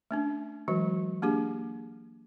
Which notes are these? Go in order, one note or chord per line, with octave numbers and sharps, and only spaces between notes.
A3 C#4 D4
E3 F#3 G#3 F#4
A#3 D4 G4 G#4